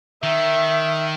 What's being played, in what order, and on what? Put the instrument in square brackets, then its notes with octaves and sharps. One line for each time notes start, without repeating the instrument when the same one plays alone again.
[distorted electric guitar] D#3 [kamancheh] E5